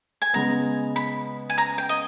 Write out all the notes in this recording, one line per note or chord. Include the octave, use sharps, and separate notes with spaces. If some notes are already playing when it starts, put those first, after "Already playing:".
G#5
C#3 G#3 B3 A#5
B5
G#5
A#5
G5
D#5